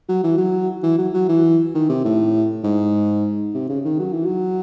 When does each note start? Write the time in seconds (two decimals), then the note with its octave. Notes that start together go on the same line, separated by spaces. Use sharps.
0.09 F#3
0.24 E3
0.38 F#3
0.83 E3
0.98 F#3
1.14 F#3
1.29 E3
1.74 D#3
1.89 C3
2.04 A2
2.64 G#2
3.54 C3
3.69 C#3
3.85 D#3
3.99 F#3
4.13 E3
4.26 F#3